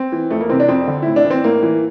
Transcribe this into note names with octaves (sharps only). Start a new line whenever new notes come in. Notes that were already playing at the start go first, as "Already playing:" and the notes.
Already playing: C4
E3
F2 A3
A#3
C3 E3 C4
D4
F2 C4
D3
A2 E4
D4
E3
C4
A2 A#3
E3